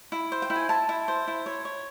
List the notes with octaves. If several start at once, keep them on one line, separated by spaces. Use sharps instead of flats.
E4
C5
G5
E4
G#5
E4 A5
E4
C5
E4
C#5
C#5